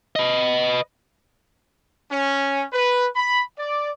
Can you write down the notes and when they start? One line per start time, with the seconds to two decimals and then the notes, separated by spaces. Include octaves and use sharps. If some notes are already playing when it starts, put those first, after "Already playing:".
0.16 B4 D#5
2.10 C#4
2.71 B4
3.16 B5
3.57 D5